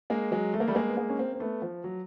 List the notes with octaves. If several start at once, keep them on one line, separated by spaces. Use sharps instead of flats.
G#3 A#3
F#3 G#3
A3
A#3
G3 A3
G#3 A#3
B3
G#3 A#3
C#4
A#3 C4
C4
A3 B3
F3
F#3